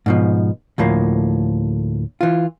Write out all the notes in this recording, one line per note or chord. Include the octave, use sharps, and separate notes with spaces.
G#2 B2 F3
D2 A2 F3 A#3
E3 F4